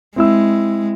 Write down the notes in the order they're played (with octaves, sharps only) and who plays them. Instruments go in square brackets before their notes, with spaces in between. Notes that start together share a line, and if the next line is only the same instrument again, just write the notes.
[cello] G#3 [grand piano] C4 E4 E6